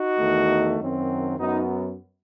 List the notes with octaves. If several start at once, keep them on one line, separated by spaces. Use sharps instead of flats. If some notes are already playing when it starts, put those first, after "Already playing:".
Already playing: D#4 F#4
E2 D#3 A3
F#2 D#3 F#3 C4
F#2 F#3 B3 D#4